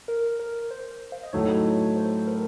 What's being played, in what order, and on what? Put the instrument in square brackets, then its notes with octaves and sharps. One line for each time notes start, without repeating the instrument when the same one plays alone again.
[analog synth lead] A#4
A#4
C5
F5
D#5
[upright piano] A2 F#3 A3 D#4 [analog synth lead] C#5
[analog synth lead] C#5
C5
A#4